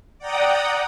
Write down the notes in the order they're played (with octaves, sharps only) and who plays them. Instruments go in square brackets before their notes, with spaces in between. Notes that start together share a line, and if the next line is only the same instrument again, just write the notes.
[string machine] D5 F#5 G5 A#5 D#6